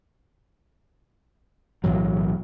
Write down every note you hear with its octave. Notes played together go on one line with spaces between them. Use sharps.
B1 A2 E3 F#3